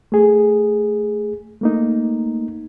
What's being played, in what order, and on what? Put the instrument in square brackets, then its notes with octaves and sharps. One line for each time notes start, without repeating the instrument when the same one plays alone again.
[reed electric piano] A3 G#4
A3 A#3 D#4